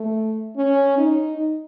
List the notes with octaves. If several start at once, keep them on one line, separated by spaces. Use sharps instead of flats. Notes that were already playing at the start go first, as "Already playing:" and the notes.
Already playing: A3
C#4
D#4